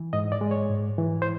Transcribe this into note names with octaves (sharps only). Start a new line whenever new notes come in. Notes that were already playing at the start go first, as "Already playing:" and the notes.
Already playing: E3
G#2 D#5
D5
G#3
C#5
G#2
E3
C5